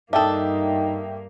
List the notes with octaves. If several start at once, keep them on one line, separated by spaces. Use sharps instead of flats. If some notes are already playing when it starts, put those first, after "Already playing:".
G2 A#3 D4 D#4 A4 E5 G5 D#6